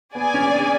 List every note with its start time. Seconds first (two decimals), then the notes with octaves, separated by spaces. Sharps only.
0.15 B3 G#4 D5 G#5
0.34 C#4
0.54 D4